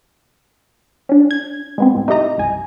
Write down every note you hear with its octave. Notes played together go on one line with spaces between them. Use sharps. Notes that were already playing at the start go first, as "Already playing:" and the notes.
C#4 D4
G#6
G#3 B3 C4
C#2 A2
D#4 E4 G4 D#5 A#5
G1 C2 G#5